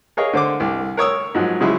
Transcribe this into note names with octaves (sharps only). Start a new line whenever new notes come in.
G#4 A#4 C#5 D#5 F5
D3 C5 D6
C2
A#4 C#5 D#6 E6
G#2 F3 F#3
C#3 F3 F#3 G#3 E4